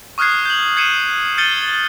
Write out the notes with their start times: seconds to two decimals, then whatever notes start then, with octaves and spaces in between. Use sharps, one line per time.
0.18 C#6 D#6 F6 F#6 G#6 C7
0.45 G6 F#7
0.77 G#6 C7 C#7 D#7 E7
1.38 F6 G6 A6 C#7 D#7 G7